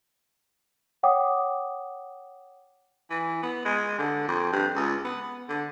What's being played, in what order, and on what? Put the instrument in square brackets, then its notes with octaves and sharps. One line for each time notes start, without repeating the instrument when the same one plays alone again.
[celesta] C#5 F#5 G5 D6 D#6
[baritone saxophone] E3
B3
G#3
D3
F2
G2
C#2
B3
D3